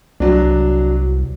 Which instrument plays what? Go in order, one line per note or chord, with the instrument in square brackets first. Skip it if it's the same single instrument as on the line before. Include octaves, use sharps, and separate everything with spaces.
[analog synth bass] C2 [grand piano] F#3 D4